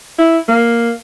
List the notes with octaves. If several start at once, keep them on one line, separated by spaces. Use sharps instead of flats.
E4
A#3